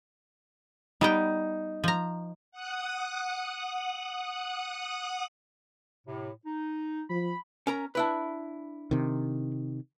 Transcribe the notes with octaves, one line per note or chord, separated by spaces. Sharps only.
G3 B3 D#4 G5
F3 A#5
F#5 D#6 F#6
A2 C3
D#4
F3 B5
C#4 A#4 A#5
D4 E4 B4
C3 D#3